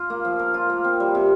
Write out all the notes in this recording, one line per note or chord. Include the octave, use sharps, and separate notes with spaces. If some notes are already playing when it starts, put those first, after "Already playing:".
Already playing: F4
A#3
F3
A#4
F4
A#3
C4
G3
C3